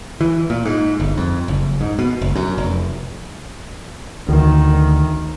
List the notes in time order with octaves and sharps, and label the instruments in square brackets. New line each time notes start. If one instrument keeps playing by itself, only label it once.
[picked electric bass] E3
A#2
G#2
G1
F2
F#1
G#2
B2
F#1
F#2
F1
[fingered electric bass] D2 [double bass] D#3